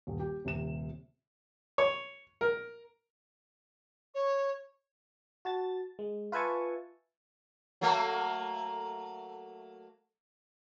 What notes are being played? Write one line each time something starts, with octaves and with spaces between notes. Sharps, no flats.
D#1
G4
D#1 C3 E7
C#5
A#4
C#5
F#4 A5 A6
G#3
F4 B4 E5 G#5 A5 C#6
F#3 A3 A#3